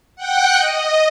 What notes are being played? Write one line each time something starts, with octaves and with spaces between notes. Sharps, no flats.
F#5 G5 F#6
D#5